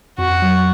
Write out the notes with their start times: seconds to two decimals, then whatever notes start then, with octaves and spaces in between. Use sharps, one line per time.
0.18 F2 F#4
0.42 F#3